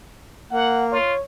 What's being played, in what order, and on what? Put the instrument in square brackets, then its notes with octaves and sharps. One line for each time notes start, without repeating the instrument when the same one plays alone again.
[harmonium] A#3 [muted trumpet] F#5
[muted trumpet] F4 [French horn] C#5